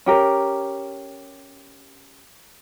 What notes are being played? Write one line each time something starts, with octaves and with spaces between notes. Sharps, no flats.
C#4 G4 A#4